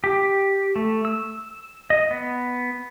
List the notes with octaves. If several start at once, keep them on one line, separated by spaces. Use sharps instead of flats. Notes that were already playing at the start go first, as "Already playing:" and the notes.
G4
A3
E6
D#5
B3